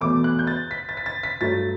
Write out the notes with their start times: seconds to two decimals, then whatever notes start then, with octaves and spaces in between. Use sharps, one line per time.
0.01 E2 B2 A3 D6
0.24 F#6
0.39 G6
0.47 A6
0.71 B6
0.89 A6
0.97 B6
1.06 A6
1.23 B6
1.41 G2 F#3 A3 A6